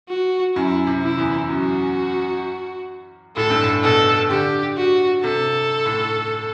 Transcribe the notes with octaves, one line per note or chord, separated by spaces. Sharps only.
F#4
F#2 E4
C3
E4
E2
F#2 F#4
A2 A4
G2
A2
B2 A4
D3 G4
F#4
C3 A4
A2